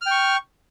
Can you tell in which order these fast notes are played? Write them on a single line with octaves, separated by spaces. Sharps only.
F6 G5 C#6